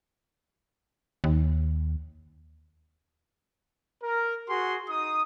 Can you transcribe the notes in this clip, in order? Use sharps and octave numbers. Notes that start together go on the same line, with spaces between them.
D#2
A#4
F#4 G#4 C6
D#4 D#6